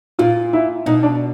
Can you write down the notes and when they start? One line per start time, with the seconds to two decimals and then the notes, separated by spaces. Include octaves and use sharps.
0.19 A#2 F4
0.53 E4
0.86 B2 D#4
1.03 D4